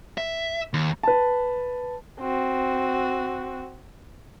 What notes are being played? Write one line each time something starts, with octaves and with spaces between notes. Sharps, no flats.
E5
D#2
B4 A5
C4 F#4